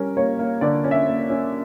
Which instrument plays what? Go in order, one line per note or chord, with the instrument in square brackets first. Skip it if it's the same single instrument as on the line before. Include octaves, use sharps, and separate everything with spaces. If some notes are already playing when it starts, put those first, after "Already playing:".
Already playing: [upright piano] G3 C#4 A#4
A#3 C#5
A#3
D3 D5
C#4
E5
A#3
C#4